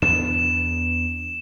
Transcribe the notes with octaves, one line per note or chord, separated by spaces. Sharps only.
E2 B3 D4 E7